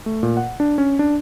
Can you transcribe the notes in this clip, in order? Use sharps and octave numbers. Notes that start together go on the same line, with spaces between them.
A3
A#2
F#5
D4
C#4
D4